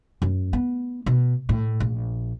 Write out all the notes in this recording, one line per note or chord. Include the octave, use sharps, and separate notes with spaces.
F#2
B3
B2
A2
A#1